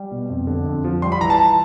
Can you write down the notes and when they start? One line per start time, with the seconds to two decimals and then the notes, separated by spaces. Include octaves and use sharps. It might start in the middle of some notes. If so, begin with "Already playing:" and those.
Already playing: G3
0.11 B2
0.30 F2
0.47 D3
0.66 F2
0.84 F3
1.02 G3 C6
1.12 B5
1.21 E3 A#5
1.30 A5